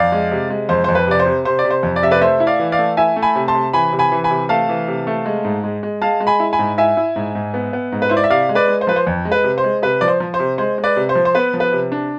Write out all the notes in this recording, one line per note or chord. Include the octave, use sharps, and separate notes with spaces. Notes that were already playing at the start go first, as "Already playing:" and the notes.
Already playing: F2 D5 F5
G#3
C3
G#3
F2 C5
F2 C5
B4
C3 D5
C5
C3
C3 C5
D5
C3
C5
F2
D5
C3 E5
B4 D5
A3 C5 E5
E4
D5 F5
E3
D5 F5
A3
E4 E5 G#5
A3
G#5 B5
C3
A5 C6
C3
E3 G#5 B5
C3
G#5 B5
E3
G#5 B5
C3
A3 F5 A5
E3
C3
A3
G#3
G#2
G#3
G#3
G#3 F5 A5
G#3
G#5 B5
E4
G#5 B5
G#2
E4 E5 G#5
E4
G#2
G#2
B3
B3
G#2
B4
E4 C5
D5
E5
C3 D5 F5
G#3
B4 D5
G#3
C5
F3 B4
C5
F2
G#3
B4
C3
C5
G#3
C3 B4
F3 D5
C5
F3
C5
C3
G#3 C5
G#3
B4 D5
C3
C5
F3
C5
B3 B4
F3
B4
C3
D4